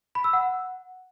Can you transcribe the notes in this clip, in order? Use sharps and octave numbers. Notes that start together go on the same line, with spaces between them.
B5
E6
F#5